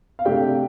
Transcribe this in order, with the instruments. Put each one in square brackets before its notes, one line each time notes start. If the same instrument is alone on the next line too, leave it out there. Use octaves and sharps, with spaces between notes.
[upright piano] F5
C3 A3 D4 G4 G5